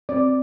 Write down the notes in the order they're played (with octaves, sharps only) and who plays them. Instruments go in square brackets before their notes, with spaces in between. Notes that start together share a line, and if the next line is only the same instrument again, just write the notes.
[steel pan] C4 D5